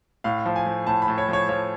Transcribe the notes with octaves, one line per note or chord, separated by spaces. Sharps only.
A2 F5
F3
G#5
F3
A2 A5
B5
A2
C#5
F3 C#5
F3 C#5